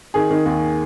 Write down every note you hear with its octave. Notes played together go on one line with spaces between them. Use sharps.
D#3 G#4
D#3
D#2